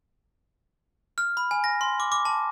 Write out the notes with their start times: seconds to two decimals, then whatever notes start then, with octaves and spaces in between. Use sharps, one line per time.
1.18 F6
1.37 B5
1.51 G#5
1.64 A#6
1.81 C6
2.00 D6
2.12 D6
2.25 A5